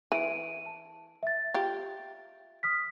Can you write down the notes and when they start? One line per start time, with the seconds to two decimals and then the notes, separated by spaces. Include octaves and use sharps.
0.12 E3 D7 D#7
0.66 A5
1.23 E5 A6
1.54 F4 G4
2.63 D#6 F6 B6